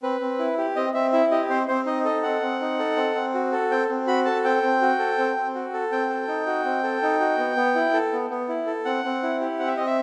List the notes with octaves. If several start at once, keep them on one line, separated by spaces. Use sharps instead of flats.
C4 B4
C4
E4
G4
C4 D#5
C4 E5
E4 E5
G4 D#5
C4 C5
C4 C5
D#4 D#5
A4 D#5
C4 F#5
C4
D#4
A4
C4
C4
F#4
A4
C4 G5
C4
F#4 B5
A4 A5
C4 G5
C4
F#4
A4
C4
C4
F#4
A4
C4 G5
A4
D#4
F#4
C4
A4
D#4
F#4
B3
B3
E4
A4
B3
B3
E4
A4
C4 F#5
C4
E4
G4
C4 F#5
E5
C4 D#5
E5